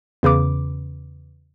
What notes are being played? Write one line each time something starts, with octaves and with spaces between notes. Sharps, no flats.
E2 C#3 B4 D6